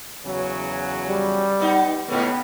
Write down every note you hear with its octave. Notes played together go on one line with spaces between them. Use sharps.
E2 C#3 F#3
G3
B3 D#4
G#2 C#3 A3 B3